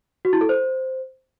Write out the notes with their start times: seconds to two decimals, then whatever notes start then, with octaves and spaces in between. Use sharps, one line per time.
0.25 F#4
0.33 E4
0.41 A4
0.49 C5